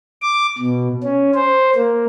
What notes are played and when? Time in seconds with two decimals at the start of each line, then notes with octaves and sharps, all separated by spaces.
0.22 D6
0.58 B2
1.03 C#4
1.35 C5
1.76 A#3